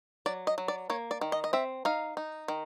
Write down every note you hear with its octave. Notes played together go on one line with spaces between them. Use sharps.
F#3 D5
D#5
F#3
D5
A#3 C#5
D5
D#3
D#5
D#5
C4 E5
D#4 F5
D#4
D#3